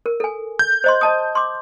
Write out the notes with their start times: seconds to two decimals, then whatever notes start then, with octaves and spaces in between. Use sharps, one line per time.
0.06 A#4
0.20 A4 G#5
0.59 G6
0.84 C5 D#5 C6
1.01 D#5 A5 D#6
1.35 C6 D6